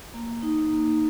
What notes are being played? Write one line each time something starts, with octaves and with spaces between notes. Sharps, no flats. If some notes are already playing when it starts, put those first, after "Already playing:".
A#3
D#4
A#3